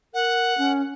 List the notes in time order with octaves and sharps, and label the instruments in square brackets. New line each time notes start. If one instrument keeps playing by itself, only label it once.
[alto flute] A#4 [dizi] F#5
[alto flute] C#4